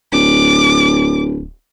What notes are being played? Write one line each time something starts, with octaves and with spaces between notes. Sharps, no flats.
D1 D6